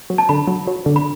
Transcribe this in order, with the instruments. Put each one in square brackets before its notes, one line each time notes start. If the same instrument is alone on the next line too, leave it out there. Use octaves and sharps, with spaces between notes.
[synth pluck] F#3
[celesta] A5
[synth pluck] D3 [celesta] B5
[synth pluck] F#3
F#3
D3
[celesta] B5